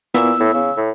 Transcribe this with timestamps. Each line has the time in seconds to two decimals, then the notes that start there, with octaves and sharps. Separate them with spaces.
0.14 A#2 B3 E4 E6
0.40 A2
0.54 C#3
0.77 A2